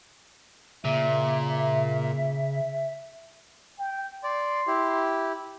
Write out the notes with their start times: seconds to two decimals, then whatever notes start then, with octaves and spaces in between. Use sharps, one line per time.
0.84 A#2 C#3 E5
3.78 G5
4.24 D5 C6
4.67 E4 G4